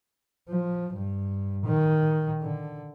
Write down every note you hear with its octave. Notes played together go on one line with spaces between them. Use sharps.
F3
G2
D#3
D3